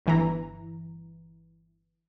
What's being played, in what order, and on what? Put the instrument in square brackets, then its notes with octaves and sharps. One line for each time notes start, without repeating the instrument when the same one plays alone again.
[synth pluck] G1 E3 A#5